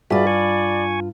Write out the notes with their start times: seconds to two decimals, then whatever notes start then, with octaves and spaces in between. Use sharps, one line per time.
0.11 G2 F4 F#4 G#4 D5 E5 B5 D6
0.27 G#5 C#6